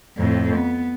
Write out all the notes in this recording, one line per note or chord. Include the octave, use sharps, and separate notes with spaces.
F2 A2
B3